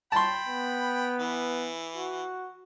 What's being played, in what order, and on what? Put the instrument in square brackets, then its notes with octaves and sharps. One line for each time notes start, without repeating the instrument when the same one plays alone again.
[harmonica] G5 B5 [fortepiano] A5 C6
[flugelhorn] B3
[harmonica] E3
[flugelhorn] F#4